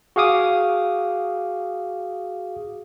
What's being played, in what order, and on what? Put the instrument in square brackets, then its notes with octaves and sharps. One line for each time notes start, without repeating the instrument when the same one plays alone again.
[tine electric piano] F#4 G#4 F5 D6 D#6